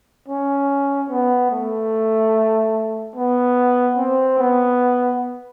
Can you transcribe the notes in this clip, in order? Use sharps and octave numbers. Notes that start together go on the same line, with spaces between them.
C#4
B3
A3
B3
C4
B3